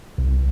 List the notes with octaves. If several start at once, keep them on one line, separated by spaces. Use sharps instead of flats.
C2